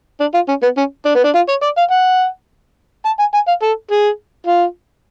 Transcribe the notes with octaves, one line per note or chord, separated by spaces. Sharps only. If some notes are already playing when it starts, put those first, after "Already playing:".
D4
F4
C#4
B3
C#4
D4
B3
D4
F4
C#5
D5
F5
F#5
A5
G#5
G#5
F5
A4
G#4
F4